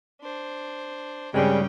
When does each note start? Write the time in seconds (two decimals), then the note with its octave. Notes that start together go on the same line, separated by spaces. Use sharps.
0.21 D4 C5
1.34 G2 C#3 G3 G#3 C4 C#4 G#4 G5